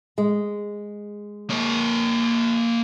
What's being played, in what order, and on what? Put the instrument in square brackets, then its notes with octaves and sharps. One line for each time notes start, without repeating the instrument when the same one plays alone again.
[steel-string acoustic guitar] G#3
[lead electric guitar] A#3 C#5